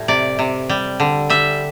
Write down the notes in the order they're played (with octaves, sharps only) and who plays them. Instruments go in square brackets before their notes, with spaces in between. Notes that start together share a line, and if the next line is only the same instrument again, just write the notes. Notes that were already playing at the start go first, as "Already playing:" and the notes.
Already playing: [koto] A2 G3
C3 D5
C3
G3
D3
G3 E5